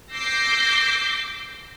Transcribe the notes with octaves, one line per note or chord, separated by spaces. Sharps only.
D6 E6 G6 A#6 C7